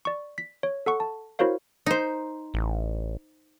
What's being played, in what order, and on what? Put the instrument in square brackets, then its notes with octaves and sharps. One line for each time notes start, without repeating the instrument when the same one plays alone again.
[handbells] D5 C#6
B6
C#5
A4 F#5 C#6
A5
E4 F#4 A#4 C5 C#5 F5
[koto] D#4 C5
[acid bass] A1